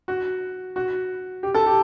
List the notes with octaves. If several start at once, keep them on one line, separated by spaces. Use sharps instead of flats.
F#4
F#4
G4
A4
G4